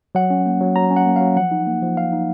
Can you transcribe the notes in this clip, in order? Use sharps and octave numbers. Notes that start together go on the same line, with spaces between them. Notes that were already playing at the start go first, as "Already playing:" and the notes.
F#3 F#5
C#4
A#3
F#3
F#3 A#5
C#4
F#5
A#3
F#3 F5
F3 F#5
D#4
A#3
F3
F3 F5
D#4